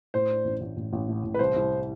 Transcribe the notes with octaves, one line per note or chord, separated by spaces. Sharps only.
A2 C5
D4
A1
A1
A1
A1
A2
A1
B4
C2 C5
C2